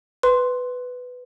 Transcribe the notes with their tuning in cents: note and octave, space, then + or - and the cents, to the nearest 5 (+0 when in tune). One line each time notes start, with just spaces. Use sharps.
B4 +10 C6 +0